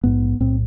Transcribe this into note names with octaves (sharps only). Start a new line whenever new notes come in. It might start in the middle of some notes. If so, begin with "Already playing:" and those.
A#1 G#2 B3
B1 A2 C4